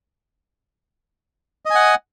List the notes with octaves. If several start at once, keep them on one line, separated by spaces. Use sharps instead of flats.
D#5 F#5 G#5